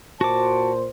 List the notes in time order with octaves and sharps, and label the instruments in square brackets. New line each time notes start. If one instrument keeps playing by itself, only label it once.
[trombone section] A#2 C5 [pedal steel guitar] F#4 D6 [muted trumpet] A5